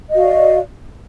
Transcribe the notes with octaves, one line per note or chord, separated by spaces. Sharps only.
F#4 D5 D#5 F5